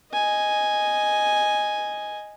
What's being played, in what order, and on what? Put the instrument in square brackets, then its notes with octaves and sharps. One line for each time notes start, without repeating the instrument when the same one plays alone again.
[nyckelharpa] D#5 G#5